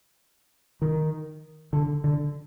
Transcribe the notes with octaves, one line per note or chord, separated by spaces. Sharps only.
D#3
D3
D3